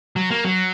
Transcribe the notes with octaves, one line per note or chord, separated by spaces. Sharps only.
F#3
A#3
F#3